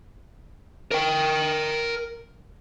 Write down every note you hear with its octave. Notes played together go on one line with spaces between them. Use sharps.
A#4 G5